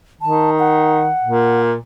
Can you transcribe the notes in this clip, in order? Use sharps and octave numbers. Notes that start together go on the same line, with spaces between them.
D#3 A5
F#5
A#2